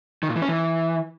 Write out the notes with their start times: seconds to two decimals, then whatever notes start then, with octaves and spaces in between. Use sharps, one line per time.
0.23 D#3
0.29 A#2
0.36 E3
0.42 C#4
0.49 E3